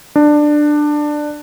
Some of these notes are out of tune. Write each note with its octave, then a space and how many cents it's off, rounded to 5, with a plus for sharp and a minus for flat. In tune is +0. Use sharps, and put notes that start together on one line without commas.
D4 +15